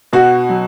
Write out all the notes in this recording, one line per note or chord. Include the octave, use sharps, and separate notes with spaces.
B2 F#4
F#3